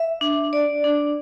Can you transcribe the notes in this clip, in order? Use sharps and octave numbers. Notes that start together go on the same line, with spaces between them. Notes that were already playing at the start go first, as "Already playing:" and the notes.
Already playing: E5
D4
D5
D4